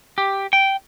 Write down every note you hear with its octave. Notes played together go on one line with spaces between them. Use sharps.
G4
G5